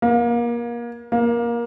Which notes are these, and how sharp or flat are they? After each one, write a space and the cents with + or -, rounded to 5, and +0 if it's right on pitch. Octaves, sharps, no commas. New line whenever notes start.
A#3 +30
A#3 +20